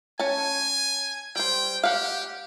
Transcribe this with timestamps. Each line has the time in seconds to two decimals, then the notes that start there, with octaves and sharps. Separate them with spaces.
0.19 C#4 G#5 A5
1.36 G3 C5 G5
1.83 G4 F5 F#5